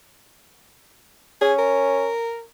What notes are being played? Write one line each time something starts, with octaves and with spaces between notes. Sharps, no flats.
C#4 G#4
A#4